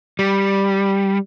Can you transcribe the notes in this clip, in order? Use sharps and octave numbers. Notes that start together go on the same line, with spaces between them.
G3